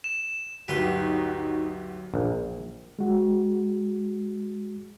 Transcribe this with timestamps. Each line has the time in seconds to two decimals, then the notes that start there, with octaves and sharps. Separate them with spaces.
0.04 E7
0.68 G1 D2 F#3 D#4 F#4 G4 B4 C6
2.14 A#1
2.99 G#3 F#4